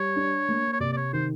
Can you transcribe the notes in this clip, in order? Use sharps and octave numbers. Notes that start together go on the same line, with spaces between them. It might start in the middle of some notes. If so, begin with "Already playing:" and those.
Already playing: G3 C#5
D4
A#3
C#5
C3 D5
D5
C#5
D#3 C5